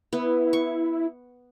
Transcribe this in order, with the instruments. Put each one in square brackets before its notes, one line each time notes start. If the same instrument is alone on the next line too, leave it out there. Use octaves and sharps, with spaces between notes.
[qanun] B3 [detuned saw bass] E4
[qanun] C#6